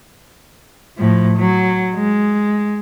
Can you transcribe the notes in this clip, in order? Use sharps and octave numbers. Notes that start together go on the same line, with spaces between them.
A2 F3
F#3
G#3